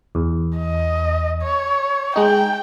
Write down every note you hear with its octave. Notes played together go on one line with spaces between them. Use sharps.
E2
D#5
C#5
G#3 D#4 G5